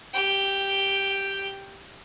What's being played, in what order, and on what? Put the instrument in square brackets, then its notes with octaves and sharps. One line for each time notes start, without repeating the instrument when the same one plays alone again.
[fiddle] G4 G5